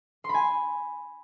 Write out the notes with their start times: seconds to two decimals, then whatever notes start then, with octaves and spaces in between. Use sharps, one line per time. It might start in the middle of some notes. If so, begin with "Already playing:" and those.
0.24 C6
0.29 B5
0.34 G#5